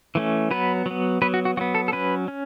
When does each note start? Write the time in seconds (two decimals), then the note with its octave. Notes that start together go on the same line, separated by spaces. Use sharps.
0.15 E3 A3 C#4
0.51 F#3 B3 B4
0.86 F#3 B3
1.22 F#3 B3 B4
1.34 F#4
1.45 F#4
1.57 F#3 F#4
1.61 B3
1.75 A4
1.88 A4
1.92 F#3 C#4 B4
2.28 C#4